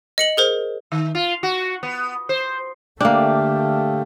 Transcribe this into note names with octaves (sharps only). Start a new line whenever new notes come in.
D#5 C#7 F#7
G#4 A#4 C5
D#3
F4
F#4
B3
C5
D3 A3 A#3 D4 G4 E5 F5